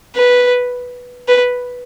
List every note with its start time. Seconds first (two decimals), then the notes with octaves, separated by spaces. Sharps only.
0.16 B4
1.28 B4